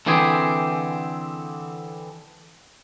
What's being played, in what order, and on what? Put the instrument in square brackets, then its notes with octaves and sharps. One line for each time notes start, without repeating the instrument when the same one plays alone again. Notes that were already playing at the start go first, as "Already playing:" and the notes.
[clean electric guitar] D3 E3 C4 G4 G#4